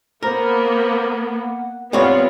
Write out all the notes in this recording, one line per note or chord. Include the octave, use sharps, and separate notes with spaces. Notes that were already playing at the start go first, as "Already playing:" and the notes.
A#3 B3 A#4 C5
F#5
G3 B3 C4 F4 C#5 F#5